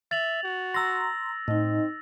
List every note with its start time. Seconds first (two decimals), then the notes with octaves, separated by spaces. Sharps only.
0.11 E5 A6 F7 F#7
0.43 F#4
0.74 A#5 C6 E6 A#6
1.48 A2 C4 D#4 D#5